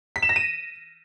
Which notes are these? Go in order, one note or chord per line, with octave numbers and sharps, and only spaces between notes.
B6
E7
A#6
D#7